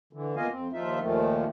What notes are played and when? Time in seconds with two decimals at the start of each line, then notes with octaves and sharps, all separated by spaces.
0.13 D3 E3
0.36 A#3 B3 F4 D#5 F5 G#5
0.51 F2 C4
0.73 D#2 F3 D#4 F4 E5
1.00 D#2 A#2 D#3 F3 A3